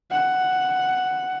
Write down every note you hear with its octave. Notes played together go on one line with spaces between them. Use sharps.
F#5